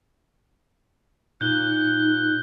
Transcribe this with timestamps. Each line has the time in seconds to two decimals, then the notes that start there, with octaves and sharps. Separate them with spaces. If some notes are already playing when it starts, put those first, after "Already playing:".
1.41 A#2 D#4 F#6 G6 G7